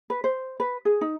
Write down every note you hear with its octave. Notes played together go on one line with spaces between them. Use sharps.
B4
C5
B4
G#4
D#4